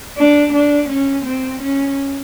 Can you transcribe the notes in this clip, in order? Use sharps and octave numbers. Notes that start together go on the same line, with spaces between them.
D4
D4
C#4
C4
C#4